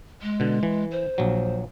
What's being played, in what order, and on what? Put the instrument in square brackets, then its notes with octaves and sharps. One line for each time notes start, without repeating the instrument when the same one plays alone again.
[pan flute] G#3
[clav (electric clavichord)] B2 D3
E3
[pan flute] C5
[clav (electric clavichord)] A#1 F#3